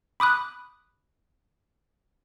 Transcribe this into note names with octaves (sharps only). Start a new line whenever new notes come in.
B5 D6 D#6 F#6